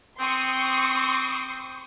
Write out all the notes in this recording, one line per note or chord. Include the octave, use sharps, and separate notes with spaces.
C4 C6 C#6 D#6